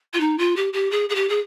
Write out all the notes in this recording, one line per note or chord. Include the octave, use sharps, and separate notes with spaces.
F4
D#4
F4
G4
G4
G#4
G#4
G4
G#4